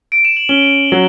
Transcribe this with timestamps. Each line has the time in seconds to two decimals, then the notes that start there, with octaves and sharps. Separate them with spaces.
0.12 D7
0.25 E7
0.37 F#7
0.49 C#4 G7
0.92 F#3